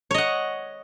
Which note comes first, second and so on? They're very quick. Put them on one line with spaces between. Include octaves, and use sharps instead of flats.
C#5 D#5 F#5